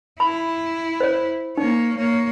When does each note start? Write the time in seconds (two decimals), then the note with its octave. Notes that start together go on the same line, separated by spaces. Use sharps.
0.20 E4 B5
1.00 C5 C#5
1.58 A#3 D#4 C#5
1.98 A#3 C#5